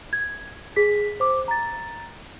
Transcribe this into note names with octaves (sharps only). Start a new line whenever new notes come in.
G#6
G#4 B6
C5 D6
A#5 A6